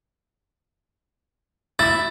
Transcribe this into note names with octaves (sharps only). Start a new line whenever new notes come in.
E4 A6